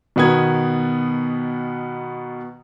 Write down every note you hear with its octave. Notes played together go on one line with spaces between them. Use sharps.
B2 D#3 B3 D#6 G#6